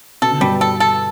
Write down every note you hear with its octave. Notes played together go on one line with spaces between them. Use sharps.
B2 A4
D3
G2 B2 G3
A4
A4